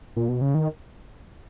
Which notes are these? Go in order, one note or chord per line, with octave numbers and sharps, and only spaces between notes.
A#2
B2
C#3
D#3